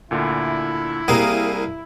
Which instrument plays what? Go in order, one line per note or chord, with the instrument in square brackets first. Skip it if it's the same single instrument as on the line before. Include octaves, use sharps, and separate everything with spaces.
[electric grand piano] D2 A#2 D3 [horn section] E4
[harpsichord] C2 A#3 D#6 [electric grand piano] G#4 F5 A#5